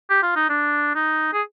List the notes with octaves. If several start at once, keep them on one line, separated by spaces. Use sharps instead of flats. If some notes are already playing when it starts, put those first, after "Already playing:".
G4
F4
D#4
D4
D#4
G#4